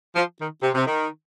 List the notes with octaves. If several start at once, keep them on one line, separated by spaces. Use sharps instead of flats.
F3
D#3
C3
C3
D#3